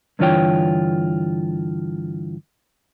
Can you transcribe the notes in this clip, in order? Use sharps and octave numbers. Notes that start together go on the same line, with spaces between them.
G2 D3 E3 F4 C#5 G5